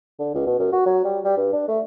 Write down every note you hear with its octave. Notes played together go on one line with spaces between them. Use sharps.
D3
C#2
B2
F#2
F#4
F#3
G3
G3
G2
D4
A3